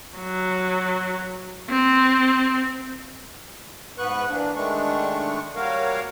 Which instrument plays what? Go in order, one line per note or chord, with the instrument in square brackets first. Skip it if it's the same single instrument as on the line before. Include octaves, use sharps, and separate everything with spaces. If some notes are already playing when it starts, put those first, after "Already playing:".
[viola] F#3
C4
[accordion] G#2 B3 B4 C#6 F#6
E3 A#3 D4
D#3 G#3 A3 D4 C#6
G3 A#3 F#4 A#4 C#5 F5